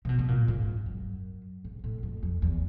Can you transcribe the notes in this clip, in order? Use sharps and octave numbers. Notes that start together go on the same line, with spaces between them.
C3
B2
B2
A#2
G#2
F#2
G#2
A2
F2
F2
E2